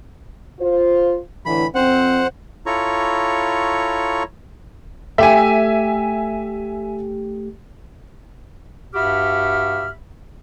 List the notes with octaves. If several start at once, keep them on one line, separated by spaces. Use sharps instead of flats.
F4 C5
A2 D3 E3 B5
F2 C4 C5 F#5
E4 F4 A4 C#5 A#5 C#6
A3 G4 E5 G#5
G2 F#4 G4 E5 B5 F6